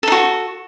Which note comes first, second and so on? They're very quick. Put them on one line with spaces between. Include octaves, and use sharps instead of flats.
A4 D#4 F#4